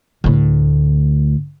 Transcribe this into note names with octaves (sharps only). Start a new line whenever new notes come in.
D2 A2